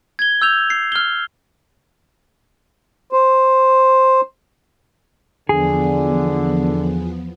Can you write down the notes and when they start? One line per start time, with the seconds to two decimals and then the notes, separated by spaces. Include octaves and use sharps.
0.19 G#6 G7
0.42 E6 G6 F7
0.70 C7
0.92 F6 G7
3.13 C5
5.49 E2 D3 F3 B3 G#4